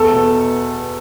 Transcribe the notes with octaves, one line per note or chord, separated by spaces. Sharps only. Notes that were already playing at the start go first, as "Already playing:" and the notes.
Already playing: E2 A4
B2